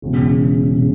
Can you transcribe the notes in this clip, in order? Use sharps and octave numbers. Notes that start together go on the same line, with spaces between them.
E1 E2 C#3
C#3